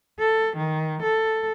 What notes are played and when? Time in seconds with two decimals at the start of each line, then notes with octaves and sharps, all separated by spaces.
0.19 A4
0.57 D#3
1.03 A4